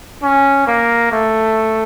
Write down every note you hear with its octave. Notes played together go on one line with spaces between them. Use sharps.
C#4
A#3
A3